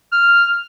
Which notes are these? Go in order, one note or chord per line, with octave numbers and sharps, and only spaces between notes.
F6